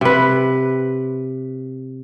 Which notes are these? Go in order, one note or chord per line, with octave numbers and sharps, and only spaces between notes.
C3 B4